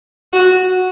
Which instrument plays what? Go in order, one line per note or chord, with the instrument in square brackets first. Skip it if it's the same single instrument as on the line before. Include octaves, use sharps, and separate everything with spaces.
[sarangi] F#4